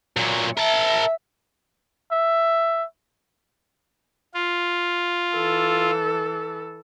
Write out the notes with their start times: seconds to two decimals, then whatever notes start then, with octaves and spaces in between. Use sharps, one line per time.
0.17 A#2 F#3
0.58 A#4 E5 A5
2.12 E5
4.34 F4
5.35 E3 A4